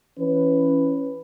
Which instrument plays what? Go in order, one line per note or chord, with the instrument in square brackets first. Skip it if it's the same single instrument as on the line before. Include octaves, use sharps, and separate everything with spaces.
[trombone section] E3 C#4 B4